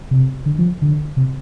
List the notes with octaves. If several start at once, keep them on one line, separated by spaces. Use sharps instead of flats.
C3
D3
F3
D3
C3